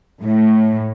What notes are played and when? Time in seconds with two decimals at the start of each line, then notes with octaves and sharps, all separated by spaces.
0.22 A2